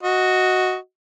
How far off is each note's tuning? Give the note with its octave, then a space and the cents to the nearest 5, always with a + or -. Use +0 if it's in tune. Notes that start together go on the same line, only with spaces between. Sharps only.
F#4 +0 D#5 +10